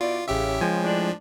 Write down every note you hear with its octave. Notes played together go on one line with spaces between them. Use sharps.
B2 E4 F4 D5
A1 C#3 G4 E5
F3 G#3 G5 G#5
A2 D4